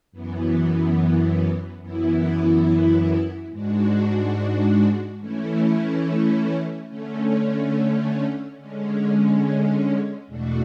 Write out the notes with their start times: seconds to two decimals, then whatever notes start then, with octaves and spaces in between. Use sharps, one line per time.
0.12 F#2 E3 B3
1.81 F#2 E3 B3 E4
3.50 G#2 G#3 D4 F#4
5.19 E3 A3 C#4 E4
6.88 D3 A3 C#4
8.58 D3 G#3 C#4
10.27 E2 B2 A3 D4 F#4